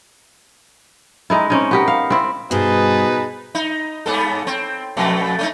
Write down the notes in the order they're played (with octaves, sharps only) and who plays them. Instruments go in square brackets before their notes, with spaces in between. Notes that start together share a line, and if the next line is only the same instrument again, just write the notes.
[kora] G#3 D#4 E4
C4 C#4 D#4
B3 G4 A#4
F5
C4 E4
[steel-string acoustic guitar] G2 C5 [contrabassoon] B2 [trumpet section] D#4 B4 [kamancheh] G#4 A5
[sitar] D#4
G2 B3 A4
C4
F2 B2 A3
A3 C#4 D#4